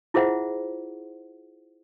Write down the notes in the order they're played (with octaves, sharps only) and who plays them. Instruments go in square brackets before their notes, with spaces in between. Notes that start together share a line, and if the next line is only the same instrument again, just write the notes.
[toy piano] E4 F4 G#4 C5 E5 F#5